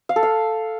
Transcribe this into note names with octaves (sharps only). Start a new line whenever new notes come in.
F5
A4
F5